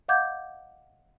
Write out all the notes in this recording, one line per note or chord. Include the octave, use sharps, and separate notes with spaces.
D#5 F5 F#5 D6 G6 G#6